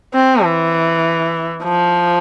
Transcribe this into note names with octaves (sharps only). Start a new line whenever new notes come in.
C4
E3
F3